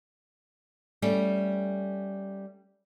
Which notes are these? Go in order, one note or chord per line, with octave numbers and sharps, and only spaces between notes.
G3 A3 C#4